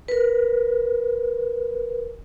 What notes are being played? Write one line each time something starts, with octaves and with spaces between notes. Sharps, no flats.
A#4 B4